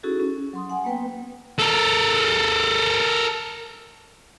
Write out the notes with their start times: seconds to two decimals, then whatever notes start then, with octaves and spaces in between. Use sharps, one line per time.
0.03 C#4 D#4 E4 F#4 G#4 A4
0.20 C#4
0.53 F#3 C6 D#6
0.70 F#5 G#5
0.84 A#3 B3 B4 G5
1.59 A4 A#4